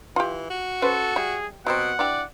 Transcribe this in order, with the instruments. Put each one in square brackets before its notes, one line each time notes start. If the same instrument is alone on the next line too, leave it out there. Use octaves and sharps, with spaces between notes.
[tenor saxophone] E3 [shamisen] F4 G4
[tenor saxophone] F#4
[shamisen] C#4 B4 C5 [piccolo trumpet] A4
[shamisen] G3 E5 [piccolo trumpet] G#4
[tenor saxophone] B2 [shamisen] F#3 G3 C4 [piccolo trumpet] F#5
[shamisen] E3 D4 G4 [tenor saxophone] D5